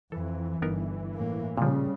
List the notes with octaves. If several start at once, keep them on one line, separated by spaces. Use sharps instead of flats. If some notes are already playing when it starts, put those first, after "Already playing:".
F2 E3 A4
G1 B3 D#4 A#4
A2 A#3
A#2 C#3 F3 G3